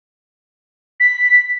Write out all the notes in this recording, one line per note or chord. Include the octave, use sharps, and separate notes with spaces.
B6